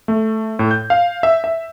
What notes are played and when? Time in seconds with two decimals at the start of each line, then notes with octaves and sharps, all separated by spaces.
0.08 A3
0.59 A2
0.71 G6
0.90 F5
1.23 E5
1.44 E5